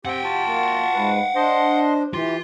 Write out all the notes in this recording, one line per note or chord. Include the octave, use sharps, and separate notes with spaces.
C4 G4 F#5 G5
F4 F#4 A5
A#3
G#2 B4
D4 C5 D#5 C6
E3 F4 G4 C6